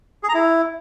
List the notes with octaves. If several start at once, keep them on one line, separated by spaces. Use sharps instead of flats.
G#4
A#5
E4